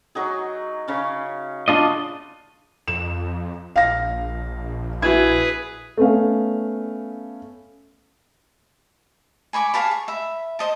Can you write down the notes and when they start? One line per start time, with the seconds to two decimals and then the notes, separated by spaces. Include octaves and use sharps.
0.15 F#3 D#4 G#4
0.88 C#3 C#4
1.68 C#3 D4 F4 D#5
2.88 F2 E7
3.76 A#1 F5 A#6
5.02 E4 F#4 G#4 B4 G#6
5.97 A3 B3 C#4 F5
9.53 G#5 B5 C#6 D6
9.74 G#4 F5 A5 B5
9.91 C#6
10.08 E5 B5
10.59 C5 D#5 A5